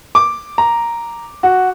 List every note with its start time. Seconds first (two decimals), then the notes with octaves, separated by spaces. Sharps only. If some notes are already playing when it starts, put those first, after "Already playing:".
0.15 D6
0.58 A#5
1.43 F#4